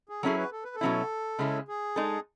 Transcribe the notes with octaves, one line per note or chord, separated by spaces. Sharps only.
G#4
F#3 C#4 E4 G#4 A4
B4
A4
B4
A4
B2 F#3 C#4 E4
C#3 G#3 C#4 E4
G#4
G#3 D#4 A4